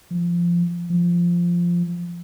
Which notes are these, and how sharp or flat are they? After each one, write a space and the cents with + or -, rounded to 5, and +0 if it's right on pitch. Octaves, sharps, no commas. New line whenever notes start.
F3 -15
F3 -5